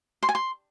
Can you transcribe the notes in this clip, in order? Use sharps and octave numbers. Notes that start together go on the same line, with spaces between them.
C6
G#5
C6